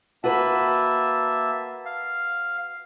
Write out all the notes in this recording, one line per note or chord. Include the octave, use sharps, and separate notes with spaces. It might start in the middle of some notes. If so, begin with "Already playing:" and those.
A#3 F#4 B4 E5 A5
F5